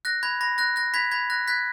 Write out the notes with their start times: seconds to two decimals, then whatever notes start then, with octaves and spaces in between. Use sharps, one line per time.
0.05 F#6 A#6
0.23 B5 G#6
0.41 B5 A#6
0.58 F#6 A#6
0.76 F#6 A#6
0.94 B5 G#6 B6
1.11 B5 G#6
1.30 F#6 A#6
1.47 F#6 G#6 B6